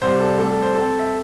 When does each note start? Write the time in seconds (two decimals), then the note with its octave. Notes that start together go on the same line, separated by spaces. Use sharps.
0.01 C2 C3 G3 C5
0.19 A4
0.38 A2 G3 C4 A4
0.50 A4
0.62 C5
0.75 A2 A3 C4 A4
0.99 E5